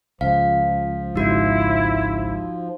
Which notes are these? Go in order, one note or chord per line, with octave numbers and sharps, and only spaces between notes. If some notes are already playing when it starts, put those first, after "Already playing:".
C#2 F3 F5
G#1 C#2 G#2 D#4 E4 F#4